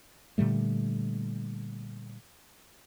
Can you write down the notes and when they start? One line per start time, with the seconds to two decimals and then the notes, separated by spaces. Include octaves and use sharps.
0.38 A#2 D3 G3 A3